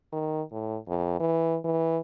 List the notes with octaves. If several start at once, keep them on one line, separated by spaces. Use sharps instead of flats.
D#3
A2
F2
E3
E3